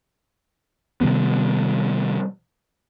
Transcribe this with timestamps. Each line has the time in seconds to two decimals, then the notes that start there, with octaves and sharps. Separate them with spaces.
1.01 C3 D#3 G3 B3